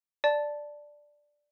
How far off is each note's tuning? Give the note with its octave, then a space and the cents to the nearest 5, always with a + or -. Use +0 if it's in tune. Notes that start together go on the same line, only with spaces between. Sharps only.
D5 +0 A5 +0